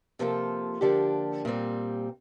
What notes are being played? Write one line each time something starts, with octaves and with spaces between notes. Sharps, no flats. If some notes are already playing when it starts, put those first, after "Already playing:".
C3 F3 A#3 F4 A4
D3 F3 A#3 D4 G4
A#2 G3 C4